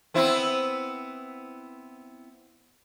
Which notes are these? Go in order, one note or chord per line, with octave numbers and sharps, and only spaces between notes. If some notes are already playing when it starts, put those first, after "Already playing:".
B3 C4 E4